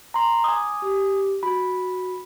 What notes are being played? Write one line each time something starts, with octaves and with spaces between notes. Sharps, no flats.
A#5 C6
G#5 D6 D#6
G4
F#4 B5